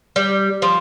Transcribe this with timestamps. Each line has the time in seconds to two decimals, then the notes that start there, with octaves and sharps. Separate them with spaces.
0.16 G3
0.62 F3